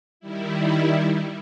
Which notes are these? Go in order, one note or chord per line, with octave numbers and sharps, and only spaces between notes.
D#3 G3 E4